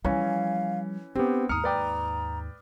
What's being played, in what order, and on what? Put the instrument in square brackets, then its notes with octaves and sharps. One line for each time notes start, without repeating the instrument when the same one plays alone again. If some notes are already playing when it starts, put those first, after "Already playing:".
[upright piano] E3 C#4 [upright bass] F3 G3 [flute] F5
[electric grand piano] B3 C4 [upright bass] D4 [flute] G4
[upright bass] D#2 G#2 [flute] A#5 [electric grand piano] D#6 F6 [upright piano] C#7
[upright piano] B4 D5 G5